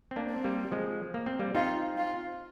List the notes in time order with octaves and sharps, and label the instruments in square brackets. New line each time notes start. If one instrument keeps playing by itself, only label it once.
[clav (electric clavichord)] C4
A#3 D4
[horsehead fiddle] C4
[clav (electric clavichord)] G3 A#3
F3 G#3
A#3
C4
G3 A#3
[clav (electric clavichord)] C4 D#4 [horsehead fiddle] F4
[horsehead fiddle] F4